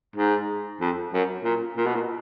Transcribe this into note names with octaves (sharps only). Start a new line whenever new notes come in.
G#2
F2
F#2
A#2
A#2
B2
A#2